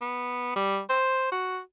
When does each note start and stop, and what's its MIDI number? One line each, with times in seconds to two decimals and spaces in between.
0.01 0.55 59
0.56 0.80 55
0.90 1.27 72
1.32 1.60 66